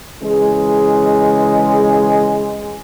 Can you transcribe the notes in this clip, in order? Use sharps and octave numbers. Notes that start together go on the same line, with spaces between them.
C#3 E3 G#3